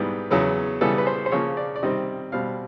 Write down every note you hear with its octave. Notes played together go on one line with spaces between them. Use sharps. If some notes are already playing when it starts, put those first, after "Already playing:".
Already playing: G#2 E3 G3 B3
E2 C#3 F#3 B3
C#3 E3 G3 B3 A4
B4
C5
C5
C#3 F3 A#3 C#5
D5
D5
C3 D#3 G3 C4 D#5
B2 G3 C4 F5